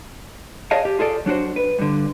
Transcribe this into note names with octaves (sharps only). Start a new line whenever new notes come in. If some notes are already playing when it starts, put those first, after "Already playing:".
G#4 C#5 D#5 F5 G#5 A5
G4
F4 G#4 A4 D5
F#3 D4 F#4 C5
B4
G2 D3